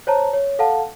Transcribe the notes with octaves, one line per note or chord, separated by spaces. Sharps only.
C5 C#5 A5 A#5
C#5
A4 F5 F#5 A5